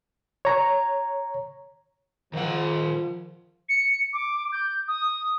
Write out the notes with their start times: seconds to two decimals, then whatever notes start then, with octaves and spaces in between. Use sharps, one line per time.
0.45 C#5 A#5
2.33 D#3 F3 F#5
3.69 C#7
4.13 D6
4.52 G6
4.88 D#6